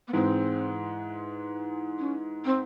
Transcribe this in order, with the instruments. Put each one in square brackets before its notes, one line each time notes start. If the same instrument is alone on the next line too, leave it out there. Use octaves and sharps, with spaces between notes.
[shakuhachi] B3
[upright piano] G#2 E3 G#3 [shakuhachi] C4
[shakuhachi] C#4
C4